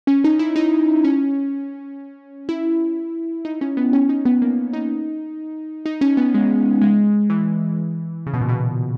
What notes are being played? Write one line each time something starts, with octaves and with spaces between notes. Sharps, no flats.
C#4
D#4
E4
D#4
C#4
E4
D#4
C#4
B3
C#4
D#4
B3
A#3
D#4
D#4
C#4
B3
G#3
G#3
E3
C#3
B2
A#2
B2